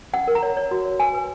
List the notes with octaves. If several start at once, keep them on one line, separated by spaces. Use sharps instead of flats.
C#4 F#5
A#4
A#5
C#5
C#5
F#4
C#5
B4 G#5
B4